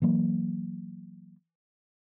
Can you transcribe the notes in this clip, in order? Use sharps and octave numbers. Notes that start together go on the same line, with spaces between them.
E3 F#3 A#3